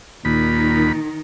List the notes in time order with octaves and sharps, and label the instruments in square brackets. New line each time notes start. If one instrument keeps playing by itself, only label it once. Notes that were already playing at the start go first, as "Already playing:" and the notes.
[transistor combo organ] D#2 B5 [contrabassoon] A#2 [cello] D#3 D#4